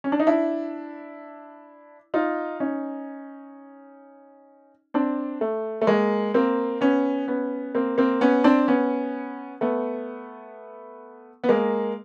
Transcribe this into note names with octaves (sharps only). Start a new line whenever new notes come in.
C#4
D4
D#4
D4 E4
D#4 F4
C#4 D#4
C4 D4
A3
A3
G#3 A#3
A#3 C4
B3 C#4
B3 C#4
A#3 C4
A#3 C4
B3 C#4
C4 D4
B3 C#4
A3 B3
B3
G#3 A#3